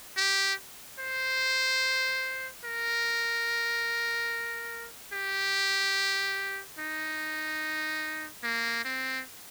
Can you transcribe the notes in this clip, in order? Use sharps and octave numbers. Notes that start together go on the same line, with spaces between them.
G4
C5
A#4
G4
D#4
A#3
C4